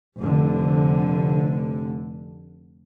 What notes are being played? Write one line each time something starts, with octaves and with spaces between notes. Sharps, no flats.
F1 D3